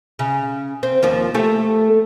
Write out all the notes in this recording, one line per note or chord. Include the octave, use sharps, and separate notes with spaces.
C#3
C4
D#2 F3 A#3
A3 G4 A4